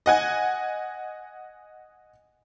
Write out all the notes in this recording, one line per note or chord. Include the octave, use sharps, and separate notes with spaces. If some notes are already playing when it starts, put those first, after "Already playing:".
D#5 F#5 G#5